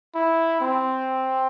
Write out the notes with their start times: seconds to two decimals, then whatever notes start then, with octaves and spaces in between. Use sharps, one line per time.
0.15 E4
0.61 C4